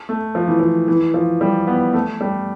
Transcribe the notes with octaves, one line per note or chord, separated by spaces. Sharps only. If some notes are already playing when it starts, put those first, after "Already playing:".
A3
F3
E3
F3
E3
F3
G3
B3
A3
G3